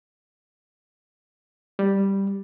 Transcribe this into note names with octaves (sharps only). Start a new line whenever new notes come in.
G3